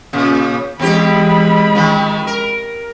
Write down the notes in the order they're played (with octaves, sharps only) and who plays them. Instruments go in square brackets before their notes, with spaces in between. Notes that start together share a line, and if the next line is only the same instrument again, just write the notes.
[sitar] A#2 C#3
[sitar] E2 C4 G4 [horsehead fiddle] G#3 B5
[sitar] D#3 F3
A#4